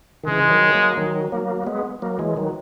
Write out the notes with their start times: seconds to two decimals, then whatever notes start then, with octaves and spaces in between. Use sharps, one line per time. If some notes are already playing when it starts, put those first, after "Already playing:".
0.24 D#3
0.27 C#3 E3 G#3
0.44 E3
0.50 D#3 F#3
0.73 F#3 A#3
0.97 D#3 F#3
1.32 F#3 A#3
1.67 G#3 B3
2.02 F#3 A#3
2.19 E3 G#3
2.37 D#3 F#3